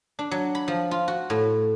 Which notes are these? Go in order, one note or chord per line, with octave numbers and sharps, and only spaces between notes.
D4
F#3
B5
F3
F4
F#4
A2